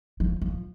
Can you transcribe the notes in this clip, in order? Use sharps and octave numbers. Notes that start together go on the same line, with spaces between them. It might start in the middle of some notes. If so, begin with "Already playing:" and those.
F3
F3